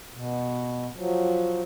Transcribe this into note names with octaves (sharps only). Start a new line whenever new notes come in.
B2
F3 F#3